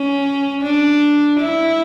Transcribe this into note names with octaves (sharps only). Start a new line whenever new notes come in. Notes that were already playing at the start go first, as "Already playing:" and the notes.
Already playing: C#4
D4
E4